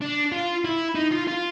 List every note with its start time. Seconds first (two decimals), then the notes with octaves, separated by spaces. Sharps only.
0.02 D4
0.32 F4
0.65 E4
0.95 D#4
1.12 F4
1.28 F4